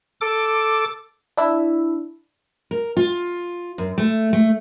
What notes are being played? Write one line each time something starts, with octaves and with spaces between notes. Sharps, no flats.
A4 D6
D4 E4 E5
A#4
F4
F#2
A3
A3